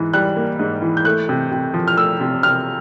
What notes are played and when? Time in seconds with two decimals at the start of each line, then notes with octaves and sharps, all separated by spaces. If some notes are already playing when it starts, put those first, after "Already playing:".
Already playing: G#2 E3
0.14 G3 F#6
0.37 A#3
0.59 G#2
0.82 E3
0.97 G6
1.05 A3 F#6
1.29 C3
1.52 C3
1.74 F3
1.88 F6
1.97 A3 E6
2.20 C3
2.43 C3 F6